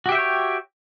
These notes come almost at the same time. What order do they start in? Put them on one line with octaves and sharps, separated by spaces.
F#4 G4 E5 G5 C#5